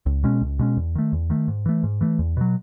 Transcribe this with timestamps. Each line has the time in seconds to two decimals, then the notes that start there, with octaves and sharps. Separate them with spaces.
0.06 C#2
0.24 B2 G#3 C#4
0.41 C#2
0.59 B2 G#3 C#4
0.77 E2
0.95 D#3 A3
1.13 E2
1.30 D#3 A3
1.48 G#2
1.66 E3 A3
1.84 G#2
2.01 E3 A3
2.19 E2
2.37 B2 F#3